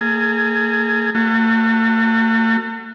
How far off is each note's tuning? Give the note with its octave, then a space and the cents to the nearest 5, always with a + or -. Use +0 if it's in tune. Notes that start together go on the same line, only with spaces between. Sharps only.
A#3 -40 G#4 +15
A3 +45 F#4 +0